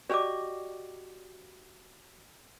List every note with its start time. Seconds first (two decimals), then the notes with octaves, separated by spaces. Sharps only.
0.10 F#4 G4 D5 D#5 D6